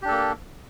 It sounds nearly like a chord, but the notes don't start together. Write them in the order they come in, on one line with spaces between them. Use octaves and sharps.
G4 D4 A4 A#3